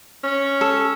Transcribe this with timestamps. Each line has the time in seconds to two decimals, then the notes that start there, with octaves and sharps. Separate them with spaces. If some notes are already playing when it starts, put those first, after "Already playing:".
0.24 C#4
0.61 A4